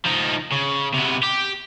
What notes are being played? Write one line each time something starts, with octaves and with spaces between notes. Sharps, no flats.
F3 D#4
C#3
C3 B3
G4